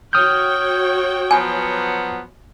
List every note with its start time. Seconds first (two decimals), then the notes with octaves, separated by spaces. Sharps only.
0.13 F#4 C#5 G5 D#6 F6 G6
1.31 F3 F#3 B3 G#5